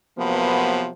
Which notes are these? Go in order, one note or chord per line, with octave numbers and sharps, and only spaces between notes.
C3 F3 F#3 A#3 B3